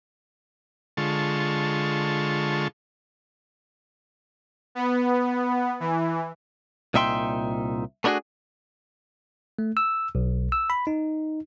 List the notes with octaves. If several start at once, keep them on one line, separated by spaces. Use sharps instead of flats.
D3 G#3 F4 A5 C#6
B3
E3
C2 A#2 D#4 E5 G5 C6
A3 B3 D4 D#4 F#4 G#4
A3
E6
B1
E6
B5
D#4